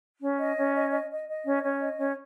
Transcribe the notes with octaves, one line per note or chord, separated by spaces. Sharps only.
C#4
D#5
C#4
D#5
D#5
D#5
D#5
C#4
C#4
D#5
C#4